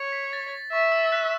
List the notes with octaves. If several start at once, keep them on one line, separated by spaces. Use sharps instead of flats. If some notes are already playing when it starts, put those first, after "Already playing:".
Already playing: C#5
B6
A6
E5 C#6
E6
F#6